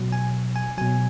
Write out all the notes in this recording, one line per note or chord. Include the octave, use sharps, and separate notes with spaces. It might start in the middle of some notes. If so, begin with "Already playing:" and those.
Already playing: B2 F#3
G#5
G#5
B2 F#3 G#5